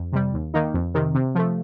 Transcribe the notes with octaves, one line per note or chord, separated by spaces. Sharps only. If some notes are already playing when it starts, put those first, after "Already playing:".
Already playing: F2
C3 G3
D#2
D#3 A#3 D#4
F2
C3 D#3
C3
F3 A3